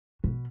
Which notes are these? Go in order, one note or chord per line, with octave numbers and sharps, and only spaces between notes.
B2